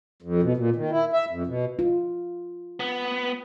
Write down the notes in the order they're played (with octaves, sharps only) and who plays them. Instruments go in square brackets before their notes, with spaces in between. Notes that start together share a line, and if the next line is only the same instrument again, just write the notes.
[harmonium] F2
B2
A#2
D#3
E4
E5
F2
B2
[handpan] F4
[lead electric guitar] B3